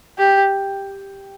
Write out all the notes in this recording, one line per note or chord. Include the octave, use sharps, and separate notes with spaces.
G4